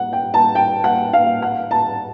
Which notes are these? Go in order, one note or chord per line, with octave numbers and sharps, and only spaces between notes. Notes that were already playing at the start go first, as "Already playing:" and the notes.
Already playing: F#5
G5
A5
G5
F#5
F5
F#5
A5